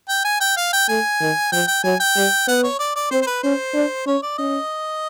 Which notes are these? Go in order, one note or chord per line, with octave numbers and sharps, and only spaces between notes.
G5
G#5
G5
F5
G5
A3 G#5
D#3
F3 G5
G5
F#3 G#5
G5
G3
B3 F#5
C#5
D5
D5
C4 C5
C5
B4
C#4 C5
D4
C#4 C#5
D5
C#4 D#5